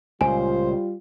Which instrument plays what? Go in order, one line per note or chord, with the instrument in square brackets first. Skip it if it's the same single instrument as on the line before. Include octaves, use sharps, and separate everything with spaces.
[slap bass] C#2 A#2 [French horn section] G3 F4 [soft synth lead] C5 [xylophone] G#5